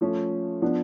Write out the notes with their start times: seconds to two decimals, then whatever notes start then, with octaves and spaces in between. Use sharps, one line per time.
0.01 F3 A3 C#4
0.62 F3 B3 D4